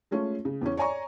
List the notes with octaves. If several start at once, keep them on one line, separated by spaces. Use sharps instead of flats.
G#3 A3 C#4 F4
C#3
E2 C#4
C#5 D5 G#5 A#5 C#6